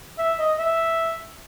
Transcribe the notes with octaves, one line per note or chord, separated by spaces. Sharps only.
E5
D#5
E5